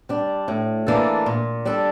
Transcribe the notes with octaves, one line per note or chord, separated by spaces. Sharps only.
G3 D4
A2
E3 A#3 D4 A4
A#2
G3 D4 A4